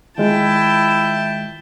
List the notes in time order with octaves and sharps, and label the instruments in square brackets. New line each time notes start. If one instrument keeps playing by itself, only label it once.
[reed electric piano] D#3 G#3 F4 [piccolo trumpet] E4 [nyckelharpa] G5 A5